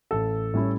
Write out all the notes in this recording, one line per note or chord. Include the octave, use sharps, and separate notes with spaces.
A1 A4
A2 G3 C#4 E4